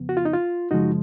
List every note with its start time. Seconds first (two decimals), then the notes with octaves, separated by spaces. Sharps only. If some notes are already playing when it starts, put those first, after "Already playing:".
Already playing: F2 C#3 F3 B3
0.09 F#4
0.17 F4
0.25 D#4
0.34 F4
0.71 F#2 C#3 F3 G#3 D#4 F#4